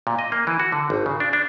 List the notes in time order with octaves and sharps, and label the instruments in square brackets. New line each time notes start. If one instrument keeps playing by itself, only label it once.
[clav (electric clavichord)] A#2
D#5
A#3
E3
F#4
D3
G#1
C#3
D4
D4